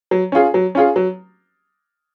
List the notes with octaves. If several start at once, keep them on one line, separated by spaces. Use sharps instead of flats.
F#3
C#4 F4 G#4
F#3
C#4 F4 G#4
F#3